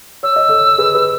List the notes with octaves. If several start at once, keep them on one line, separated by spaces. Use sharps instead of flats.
C#5 E6
D#5
A4 C#5
G#4 B4
B4